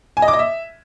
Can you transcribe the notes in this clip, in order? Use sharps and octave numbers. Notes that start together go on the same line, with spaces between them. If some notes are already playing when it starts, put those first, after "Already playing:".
G#5
D#5
D6
D#5
E5